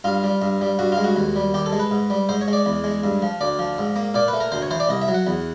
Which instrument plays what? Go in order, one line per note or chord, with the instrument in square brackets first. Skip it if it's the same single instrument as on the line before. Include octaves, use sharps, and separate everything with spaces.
[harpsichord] G2 F4
G3
G2
G3
G2 F#4
F4
G#3
F#4
D#2
G3
D#2 G4
A4
G#3
B4
G#2
G3
G#2 C5
C#5
G#3
D5
E2
G#3
G2
F3
D2 D5
F3
G#2
A#3
A#2 D5
B4
A3
A#4
D2 C5
C#5
E3 C5
D5
C2 D#5
E5
F#3
F#5
E2